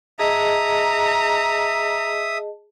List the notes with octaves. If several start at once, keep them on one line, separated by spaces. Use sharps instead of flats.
G#4 D#5 E5 A5 A#5 D#6